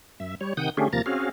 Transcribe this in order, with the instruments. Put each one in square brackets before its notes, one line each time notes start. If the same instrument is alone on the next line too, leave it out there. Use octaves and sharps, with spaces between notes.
[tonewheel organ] F#2 E5
G3 C#5
C3 D#3 F#5 D#6 G6
D3 A3 C#4 G4 G#4
D#2 C3 F3 A#3 A#5 A6
C4 C#4 F#4 G#4 F5